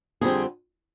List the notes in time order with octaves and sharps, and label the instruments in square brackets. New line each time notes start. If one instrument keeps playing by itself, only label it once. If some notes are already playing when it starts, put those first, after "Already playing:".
[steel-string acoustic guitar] F2 D3 G3 C4 G#4